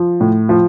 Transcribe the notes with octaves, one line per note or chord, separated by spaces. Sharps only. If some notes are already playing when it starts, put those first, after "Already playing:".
Already playing: F3
A2
F3